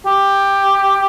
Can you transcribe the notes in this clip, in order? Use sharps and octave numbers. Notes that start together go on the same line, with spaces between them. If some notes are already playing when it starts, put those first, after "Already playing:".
G4